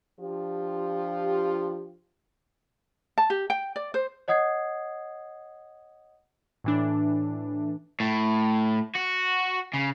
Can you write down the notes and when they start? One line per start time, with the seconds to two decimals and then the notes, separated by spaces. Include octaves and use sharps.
0.21 F3 D4 F4 G4
3.18 A5
3.30 G4
3.50 G5
3.76 D5
3.94 C5
4.28 C#5 D#5 F#5 D#6 G#6 C7
6.64 A2 E3 D4
8.00 A2
8.95 F#4
9.74 C#3